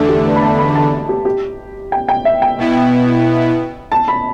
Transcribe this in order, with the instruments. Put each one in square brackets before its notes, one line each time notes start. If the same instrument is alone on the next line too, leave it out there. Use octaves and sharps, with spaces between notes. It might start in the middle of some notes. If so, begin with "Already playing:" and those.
Already playing: [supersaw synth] E2 D3 A3 D4 [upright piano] A4
[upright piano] G4
B4
B5
A5
B5
A5
G4
G4
G5
G5
E5
G5
[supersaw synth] B2 B3 E4
[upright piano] A5
B5